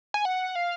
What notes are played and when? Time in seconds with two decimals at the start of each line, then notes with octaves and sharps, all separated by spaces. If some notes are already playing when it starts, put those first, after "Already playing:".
0.14 G#5
0.25 F#5
0.55 F5